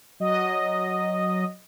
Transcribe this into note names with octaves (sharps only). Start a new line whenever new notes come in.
F#3 D#5